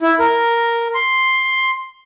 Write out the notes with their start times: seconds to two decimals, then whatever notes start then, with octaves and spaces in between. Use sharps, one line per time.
0.01 E4
0.19 A#4
0.95 C6